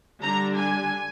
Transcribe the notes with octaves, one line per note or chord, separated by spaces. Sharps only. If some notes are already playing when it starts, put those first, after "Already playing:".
D3 G3 D4 A#5
G#5